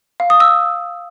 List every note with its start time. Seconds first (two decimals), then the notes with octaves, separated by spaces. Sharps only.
0.20 F5
0.30 D#6
0.40 E6